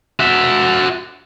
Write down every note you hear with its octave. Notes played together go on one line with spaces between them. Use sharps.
F#4 E5